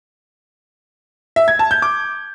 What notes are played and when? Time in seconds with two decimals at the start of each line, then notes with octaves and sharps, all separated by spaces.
1.36 E5
1.48 G#6
1.59 A5
1.71 G6
1.82 D6